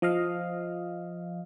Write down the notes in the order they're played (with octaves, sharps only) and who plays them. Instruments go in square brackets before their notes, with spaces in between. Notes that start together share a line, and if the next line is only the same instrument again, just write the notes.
[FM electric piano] F3 D#5 F5